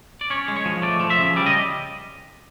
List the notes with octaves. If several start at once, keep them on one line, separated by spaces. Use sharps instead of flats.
D5
C#4 C#5
G#3
C#5
F3
A3 D5
F3
E5
C#3
G3 D5
D#5